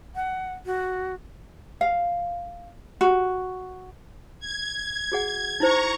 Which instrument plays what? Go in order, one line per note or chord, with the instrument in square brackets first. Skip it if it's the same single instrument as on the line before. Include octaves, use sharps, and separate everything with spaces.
[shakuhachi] F#5
F#4
[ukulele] F5
F#4
[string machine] G#6
[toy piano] F#4 G#4 F#5
[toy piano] D#4 E4 C5 [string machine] A#5 C#6